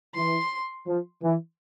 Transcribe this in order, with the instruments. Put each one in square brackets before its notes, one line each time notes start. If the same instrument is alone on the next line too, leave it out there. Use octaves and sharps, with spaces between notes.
[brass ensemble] E3 [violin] C6
[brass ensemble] F3
E3